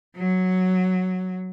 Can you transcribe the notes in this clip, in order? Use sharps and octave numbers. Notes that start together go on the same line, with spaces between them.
F#3